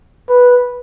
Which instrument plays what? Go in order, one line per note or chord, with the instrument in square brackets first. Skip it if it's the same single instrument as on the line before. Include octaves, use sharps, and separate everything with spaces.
[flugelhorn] B4